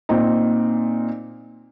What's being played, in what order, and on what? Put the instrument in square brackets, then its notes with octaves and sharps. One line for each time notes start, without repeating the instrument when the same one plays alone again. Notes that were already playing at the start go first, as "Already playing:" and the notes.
[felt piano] A#2 C4 D#4